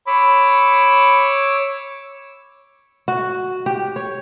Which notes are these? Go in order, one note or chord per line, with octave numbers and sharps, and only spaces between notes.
C#5 B5 D6 E6
F#4
G4
C#5